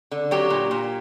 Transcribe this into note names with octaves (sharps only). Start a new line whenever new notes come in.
D3
F#3 G4
A#2
A#2